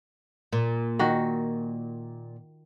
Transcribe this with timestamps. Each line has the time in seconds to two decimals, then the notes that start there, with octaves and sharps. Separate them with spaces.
0.53 A#2
0.99 D#3 F#4